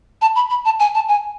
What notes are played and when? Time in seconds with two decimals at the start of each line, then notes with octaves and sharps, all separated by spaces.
0.21 A5
0.36 B5
0.50 B5
0.65 A5
0.80 G#5
0.95 A5
1.08 G#5